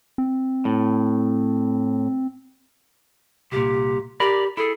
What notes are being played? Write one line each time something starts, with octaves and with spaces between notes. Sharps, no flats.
C4
A2
C2 A#2 G4
G4 A#4 D5 B5
E4 G#4 A4